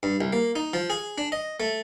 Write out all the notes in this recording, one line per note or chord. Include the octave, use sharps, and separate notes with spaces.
G2
C2
A#3
D#4
F3
G#4
D4
D#5
A3